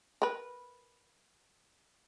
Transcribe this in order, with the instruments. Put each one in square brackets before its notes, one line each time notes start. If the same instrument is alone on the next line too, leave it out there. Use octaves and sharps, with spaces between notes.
[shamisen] A#4 B4